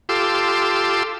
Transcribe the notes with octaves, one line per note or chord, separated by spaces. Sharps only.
F4 G4 A4 C6 D6 E6